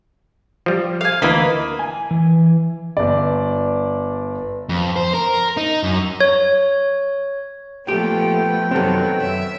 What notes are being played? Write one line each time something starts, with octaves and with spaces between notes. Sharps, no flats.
F3 G3
F5 G#5
D2 E3 A#3 D#5 B5
G#5
E3
G1 D5
F2
C5
A#4
D#4
F#2
C#5
A#2 F3 A3 B3 G4 G5
F#2 C3 D#3 F#3 B3 C4 A4
F#2 E5